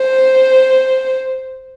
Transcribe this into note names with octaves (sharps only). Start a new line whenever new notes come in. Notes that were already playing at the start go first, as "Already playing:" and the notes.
Already playing: C5